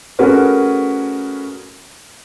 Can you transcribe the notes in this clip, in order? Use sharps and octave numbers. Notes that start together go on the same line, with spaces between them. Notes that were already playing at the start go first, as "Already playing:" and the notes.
A3 C#4 F#4 G#4 A#4 B4